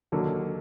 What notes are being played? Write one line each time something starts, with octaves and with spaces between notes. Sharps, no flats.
D#2 D3 F#3 A#3